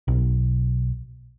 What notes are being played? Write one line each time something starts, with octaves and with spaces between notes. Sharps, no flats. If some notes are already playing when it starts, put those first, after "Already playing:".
B1